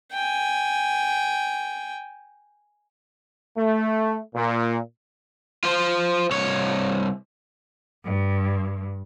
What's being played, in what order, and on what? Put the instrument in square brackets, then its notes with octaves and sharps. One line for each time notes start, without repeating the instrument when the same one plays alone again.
[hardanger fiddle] G5 G#5
[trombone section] A3
A#2
[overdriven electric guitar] F4 C5
C2 C#5
[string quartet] G2